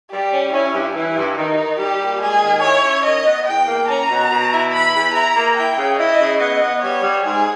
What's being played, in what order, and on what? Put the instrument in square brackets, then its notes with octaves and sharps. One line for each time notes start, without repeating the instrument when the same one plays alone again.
[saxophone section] G3 [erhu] G4
[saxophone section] C#4
[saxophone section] C#4 [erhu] E4
[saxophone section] G2
[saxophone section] E3 [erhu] E4
[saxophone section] G2
[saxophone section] D#3 [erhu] D#4
[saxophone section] D#3
[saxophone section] G3 [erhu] G4
[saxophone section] A#2
[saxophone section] G#3 [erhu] G#4
[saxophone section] D#3
[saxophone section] E4 [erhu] C#5
[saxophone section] C#4
[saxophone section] D#3 [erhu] D#5
[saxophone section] B3
[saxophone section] E2 [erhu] G5
[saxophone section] A#3
[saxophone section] C#4 [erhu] A#5
[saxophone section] B2
B2
E4
[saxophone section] E3 [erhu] B5
[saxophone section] E2
[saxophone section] E4 [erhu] A#5
[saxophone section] A#3
[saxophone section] E4 [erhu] G5
[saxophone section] C#3
[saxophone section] E4 [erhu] D#5
[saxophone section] C#3
[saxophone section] B3 [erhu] D#5
[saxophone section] B3
[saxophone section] G3 [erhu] C#5
[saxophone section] G3
[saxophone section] G#2 [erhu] G#4